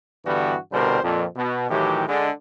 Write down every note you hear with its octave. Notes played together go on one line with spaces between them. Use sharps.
G2 D3 E3 G3 B3 F#4
C2 B2 D3 G3 A#4 C5
F2 A#2
B2
A2 D#3 E3 F#3 G4
D3 G#3 D4